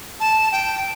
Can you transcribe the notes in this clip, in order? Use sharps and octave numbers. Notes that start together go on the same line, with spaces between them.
A5
G5